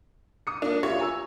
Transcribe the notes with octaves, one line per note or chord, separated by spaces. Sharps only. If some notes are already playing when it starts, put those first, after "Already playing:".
D#6 C#7
A#3 D4
F4 G4 C#5 E5
G#5 A#5 E6